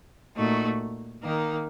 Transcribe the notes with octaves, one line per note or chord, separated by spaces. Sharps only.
A#2 A3 D#4 F#4
D#3 A#3 D#4